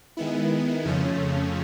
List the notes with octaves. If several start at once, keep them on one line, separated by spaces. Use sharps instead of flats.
D#3 G#3 B3 E4
F2 C#3 F3 A3 C#4